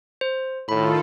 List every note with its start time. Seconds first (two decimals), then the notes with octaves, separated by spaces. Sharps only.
0.21 C5
0.69 A2 D#3 F4 A4 B5